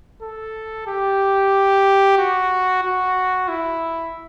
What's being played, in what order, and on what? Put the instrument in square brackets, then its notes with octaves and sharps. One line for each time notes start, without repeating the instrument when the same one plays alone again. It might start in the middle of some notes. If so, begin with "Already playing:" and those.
[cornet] A4
G4
F#4
F#4
E4